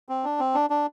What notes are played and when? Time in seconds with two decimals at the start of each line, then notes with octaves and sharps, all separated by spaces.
0.09 C4
0.24 D4
0.40 C4
0.55 D4
0.70 D4